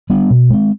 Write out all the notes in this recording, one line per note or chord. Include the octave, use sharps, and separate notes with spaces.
G3 B3 D4
B2
G#3 C4